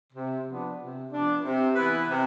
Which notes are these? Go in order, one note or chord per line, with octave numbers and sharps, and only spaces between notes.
C3
F3 B3 D4
C3
F3 B3 D4
C3
E3 B3 E4 B4
C3